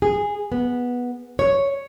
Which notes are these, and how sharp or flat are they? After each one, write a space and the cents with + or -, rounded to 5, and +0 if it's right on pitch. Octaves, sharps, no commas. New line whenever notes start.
G#4 -10
B3 -10
C#5 +0